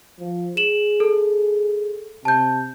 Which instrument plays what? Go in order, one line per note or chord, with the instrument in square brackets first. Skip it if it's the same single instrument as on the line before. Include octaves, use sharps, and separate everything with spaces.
[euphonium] F3
[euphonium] G#4 [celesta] E7 F#7
[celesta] A4
[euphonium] C3 [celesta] A5 G6